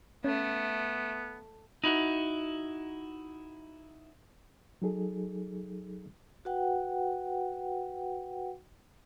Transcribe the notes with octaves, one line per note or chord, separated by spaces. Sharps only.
A3 B3 C#4
D#4 E4 F#4
F#3 D#4 G#4 A4
F#4 B4 F#5 G5